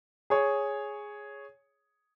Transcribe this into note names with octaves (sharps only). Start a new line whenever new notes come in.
G#4 C#5